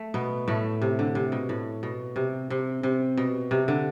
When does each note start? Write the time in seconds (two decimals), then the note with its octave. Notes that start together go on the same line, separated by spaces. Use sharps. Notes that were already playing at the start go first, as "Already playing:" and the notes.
Already playing: A3
0.14 B2 B3
0.48 A2 A3
0.82 C3
0.99 D3
1.15 C3
1.32 B2
1.49 A2
1.83 B2
2.16 C3
2.50 C3
2.83 C3
3.17 B2
3.51 C3
3.68 D3